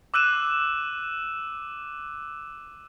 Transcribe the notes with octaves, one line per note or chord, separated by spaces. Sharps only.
D6 E6 F#6 D#7 E7